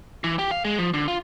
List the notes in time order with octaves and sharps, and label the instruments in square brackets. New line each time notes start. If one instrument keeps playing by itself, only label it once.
[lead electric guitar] E3
G4
F5
G#3
F3
D3
F4